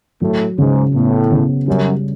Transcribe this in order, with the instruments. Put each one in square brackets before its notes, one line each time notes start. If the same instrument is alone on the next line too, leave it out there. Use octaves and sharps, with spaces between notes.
[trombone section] A2 [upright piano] F#3
[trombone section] G#2 [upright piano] C#3
[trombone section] A2 [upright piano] B3
[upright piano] C#3
[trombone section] F#2 [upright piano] G3